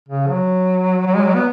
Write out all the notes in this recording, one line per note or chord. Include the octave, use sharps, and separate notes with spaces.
C#3
F#3
F#3
G#3
F#3
B3